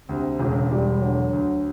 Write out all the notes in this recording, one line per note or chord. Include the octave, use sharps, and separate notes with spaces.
D2 C3
E1 C#3
E1 G3
D3 F#3
D2